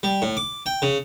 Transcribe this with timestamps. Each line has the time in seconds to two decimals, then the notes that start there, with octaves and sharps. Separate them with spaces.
0.03 G3
0.22 A2
0.37 D6
0.66 G5
0.82 C#3